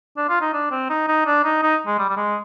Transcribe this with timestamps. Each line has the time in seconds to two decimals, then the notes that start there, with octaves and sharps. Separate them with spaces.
0.17 D4
0.29 F4
0.41 D#4
0.54 D4
0.71 C4
0.90 D#4
1.08 D#4
1.26 D4
1.44 D#4
1.63 D#4
1.87 G#3
1.98 G3
2.10 G3
2.17 G#3